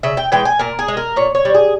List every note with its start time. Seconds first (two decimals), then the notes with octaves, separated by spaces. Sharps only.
0.03 C#3 E5
0.17 G5
0.32 E3 G#3 G5
0.45 G#5
0.59 A#2 A#4
0.79 G#4
0.88 G#3
0.97 A#4
1.16 A#2 C#5
1.35 C#5
1.45 G3
1.54 G#4